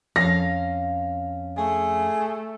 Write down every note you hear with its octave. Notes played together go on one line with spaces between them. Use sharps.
F2 C#4 F5 A#6
A3 G#4